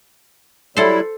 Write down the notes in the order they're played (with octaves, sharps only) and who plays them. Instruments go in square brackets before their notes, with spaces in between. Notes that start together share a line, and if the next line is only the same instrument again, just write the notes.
[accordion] F#3 G3 E4 [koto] A4 C5